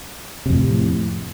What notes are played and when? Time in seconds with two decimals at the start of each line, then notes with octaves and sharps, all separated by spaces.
0.46 C3
0.50 F2
0.54 A2